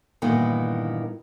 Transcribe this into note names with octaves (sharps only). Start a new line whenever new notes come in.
G2 A#2 D#3 E3 B3